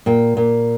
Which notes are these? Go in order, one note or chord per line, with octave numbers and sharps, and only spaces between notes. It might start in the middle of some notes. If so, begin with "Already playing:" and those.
A#2 G5
A#2